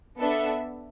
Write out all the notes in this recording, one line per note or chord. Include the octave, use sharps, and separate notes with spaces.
B3 D4 A4 E5